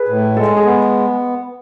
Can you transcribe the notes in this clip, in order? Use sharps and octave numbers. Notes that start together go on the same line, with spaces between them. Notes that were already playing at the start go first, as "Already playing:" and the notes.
Already playing: G#4 B4
A2
G#3 A4
G#4
B3